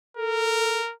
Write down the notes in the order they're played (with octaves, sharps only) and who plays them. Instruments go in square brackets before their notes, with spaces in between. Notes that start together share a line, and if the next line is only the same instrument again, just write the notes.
[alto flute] A4 [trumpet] A#4